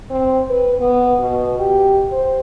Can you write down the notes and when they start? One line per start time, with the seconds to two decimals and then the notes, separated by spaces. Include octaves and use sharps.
0.10 C4
0.50 B4
0.80 B3
1.19 B2
1.60 G4
2.12 C5